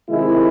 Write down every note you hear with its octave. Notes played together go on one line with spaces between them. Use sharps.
C3 D#3 G#3 E4